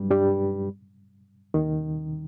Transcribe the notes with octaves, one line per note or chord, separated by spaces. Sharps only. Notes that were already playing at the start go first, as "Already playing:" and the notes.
Already playing: G2 F#3 G3
G2 G3
D#2 D#3